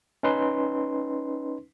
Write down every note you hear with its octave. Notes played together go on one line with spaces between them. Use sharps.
C#4 D#4 B4 C6